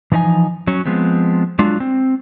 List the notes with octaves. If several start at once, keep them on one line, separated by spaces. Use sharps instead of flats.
E3 F3 D#4 D#5 G#5
F#3 C#4
F3 G#3 B3 C4
F#3 G#3 D4 F4
C4